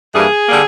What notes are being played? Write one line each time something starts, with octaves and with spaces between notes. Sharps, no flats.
G2 E3 G3 A#3 G#4
D3 G3 A#3